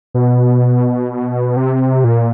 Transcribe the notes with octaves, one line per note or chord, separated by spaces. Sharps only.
B2
C3
A#2